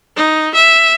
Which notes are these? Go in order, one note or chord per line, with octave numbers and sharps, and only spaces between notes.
D#4
E5